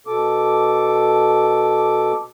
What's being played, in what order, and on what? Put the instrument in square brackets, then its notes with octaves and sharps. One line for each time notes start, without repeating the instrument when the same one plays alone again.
[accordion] B2 A4 D6